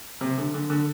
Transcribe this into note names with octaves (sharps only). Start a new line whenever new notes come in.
C3
D3
D3
D3